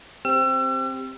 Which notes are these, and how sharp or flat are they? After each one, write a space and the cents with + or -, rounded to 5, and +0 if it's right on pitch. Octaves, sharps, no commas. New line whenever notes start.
C4 +0 G4 +15 E6 +40